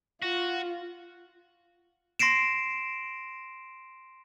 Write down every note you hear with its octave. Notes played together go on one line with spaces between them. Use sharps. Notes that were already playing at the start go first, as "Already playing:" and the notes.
F4 F#4
C6 A#6 C7 D7 E7